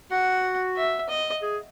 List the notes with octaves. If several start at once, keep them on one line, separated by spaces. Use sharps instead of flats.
F#4 F#5
E5
D#5
G#4